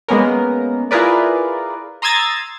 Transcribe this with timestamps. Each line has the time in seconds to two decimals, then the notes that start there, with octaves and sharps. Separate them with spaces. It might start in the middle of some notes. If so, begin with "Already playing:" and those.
0.08 G#3 A#3 B3 C#4 A#4
0.91 E4 F4 G#4 A#4 B4 D5
2.02 A#5 C6 D#6 E6 G#6 A6